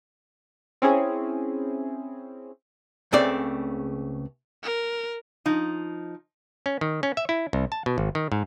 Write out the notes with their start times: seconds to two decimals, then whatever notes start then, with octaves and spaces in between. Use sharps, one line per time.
0.82 C4 C#4 E4 G#4
3.12 C#2 C#3 A3 C4 D5
4.63 A#4
5.46 F3 D#4
6.66 C#4
6.81 D#3
7.03 C#4
7.17 E5
7.29 E4
7.53 C2
7.72 A5
7.86 B2
7.98 G#1
8.15 D#3
8.32 G#2